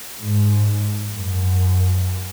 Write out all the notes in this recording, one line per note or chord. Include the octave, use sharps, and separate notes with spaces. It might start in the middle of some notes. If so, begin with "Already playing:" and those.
G#2
F#2